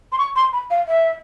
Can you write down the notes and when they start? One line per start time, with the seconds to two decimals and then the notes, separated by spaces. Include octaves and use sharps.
0.12 C6
0.18 C#6
0.36 C6
0.53 B5
0.70 F5
0.88 E5